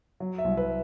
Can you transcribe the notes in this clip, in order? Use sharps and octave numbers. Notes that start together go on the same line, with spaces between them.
F#3
E5
C2
B4